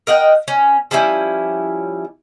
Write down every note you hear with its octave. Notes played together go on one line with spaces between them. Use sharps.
A#4 D#5 F#5 G5
C#4
F3 G3 C#4 E4